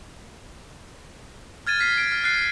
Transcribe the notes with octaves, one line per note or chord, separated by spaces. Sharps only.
F6 G#6 A6 D#7
F6 B6 C7
D7
F6
F6 F#6 A6 C7